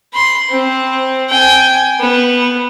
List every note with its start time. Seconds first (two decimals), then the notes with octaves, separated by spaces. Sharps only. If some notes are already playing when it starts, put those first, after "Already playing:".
0.14 B5 C6
0.50 C4
1.29 G5 G#5
2.00 B3